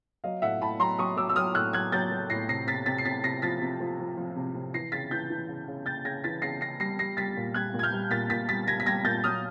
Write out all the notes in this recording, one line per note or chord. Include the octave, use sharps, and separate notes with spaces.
F#3 D#5 F5
A2 E5 F#5
A2 A5 B5
F#3 A#5 C6
F#3 C#6 D#6
F#3 D6 E6
E6
F#3 D#6 F6
A2 E6 F#6
F#3 F#6 G#6
F#3 G6 A6
F#3
A2 A#6 C7
C3 A#6 C7
C3 A6 B6
C3 A6 B6
C7
C3 A6 B6
C3 A#6 C7
F3 A6 B6
C3
F3
F3
F3
C3
C3
E3 A#6 C7
C#3 A6 B6
E3 G6 A6
E3
C#3
C#3
C#3 G6 A6
C#3 G#6 A#6
E3 A6 B6
C#3 A#6 C7
C#3 A#6 C7
G3 A#6 C7
G3 A#6 C7
G3 A6 B6
A#2
G3 F#6 G#6
A#2
G#6
F6 G6
G3
A#2 A6 B6
A#2 A6 B6
G3 A6 B6
G3 G#6 A#6
B6
G3 G#6 A#6
A#2 G6 A6
F#3 D#6 F6